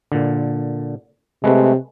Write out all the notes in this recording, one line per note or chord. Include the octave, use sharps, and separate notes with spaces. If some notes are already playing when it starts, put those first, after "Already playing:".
A#2 D3
C3 G#3 A3 B4